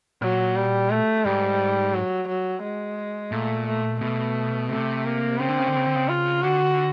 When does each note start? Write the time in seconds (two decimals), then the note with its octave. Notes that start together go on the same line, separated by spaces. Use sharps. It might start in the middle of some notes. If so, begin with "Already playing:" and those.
0.22 A#2 F#3
0.56 G3
0.90 A3
1.25 G#2 G3
1.94 F#3
2.28 F#3
2.63 G#3
3.32 A#2 A3
3.67 A3
4.01 B2 A3
4.70 C3 A3
5.05 A#3
5.39 C#3 C4
5.48 D3
5.58 C#3
5.67 D3
5.76 C#3
5.85 D3
5.96 C#3
6.08 F4
6.43 D3 F#4